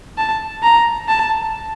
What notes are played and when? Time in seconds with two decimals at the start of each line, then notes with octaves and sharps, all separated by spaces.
0.18 A5
0.63 A#5
1.08 A5